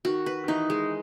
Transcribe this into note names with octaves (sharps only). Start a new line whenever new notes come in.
D#3 F#4
B4
D#3
E3 D#4
G#3